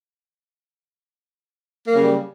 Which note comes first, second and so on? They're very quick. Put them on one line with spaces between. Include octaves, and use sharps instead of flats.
A#3 F#3 C#3 G3